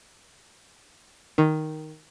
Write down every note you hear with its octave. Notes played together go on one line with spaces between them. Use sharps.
D#3